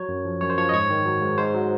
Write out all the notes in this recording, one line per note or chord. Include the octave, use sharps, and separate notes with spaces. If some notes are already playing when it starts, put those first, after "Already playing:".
Already playing: F#3 C#5
F#2
F3
F#2 C#5
C5
F3 C#5
D#5
G#2 C#5
D#3
F#3
G#2
G#2 C5
F#3